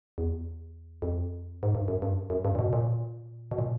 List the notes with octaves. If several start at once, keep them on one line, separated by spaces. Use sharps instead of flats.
E2
F2
G#2
G2
F#2
G2
F#2
G2
A#2
B2
A#2
B2
A#2